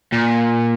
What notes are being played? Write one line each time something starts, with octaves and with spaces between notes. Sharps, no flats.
A#2